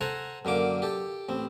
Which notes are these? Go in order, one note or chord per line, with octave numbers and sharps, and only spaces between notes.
A4 C5 F#5 G#5 A#5
F#2 D3 A#3 D6
G4 A4
A1 C4